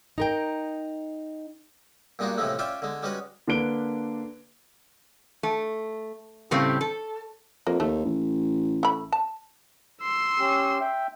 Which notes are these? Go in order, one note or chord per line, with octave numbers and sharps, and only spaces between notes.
D#4 A#4 G5
G2 A#2 G#3 D4 D#4 F#4
A2 C3 E3 F3 G#3 A3
C#4 F4 D5 E5 G5
D3 G#3
G3 G#3 C#4 F#4 B4
D3 A#3 D4 B4 D7 G7
A3
A2 C#3 G3 A3 C4
A4
F2 A#3
D#2 A3
A1
A3 B5
A5
C6 E6
C#4 G4
E5 G5